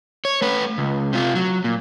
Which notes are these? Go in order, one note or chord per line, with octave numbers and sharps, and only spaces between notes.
C#5
A3 B4
C#2
C3 F4
F#3
A#2